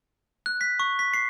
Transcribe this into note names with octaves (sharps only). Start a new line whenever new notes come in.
F#6
B6
C#6
B6
C7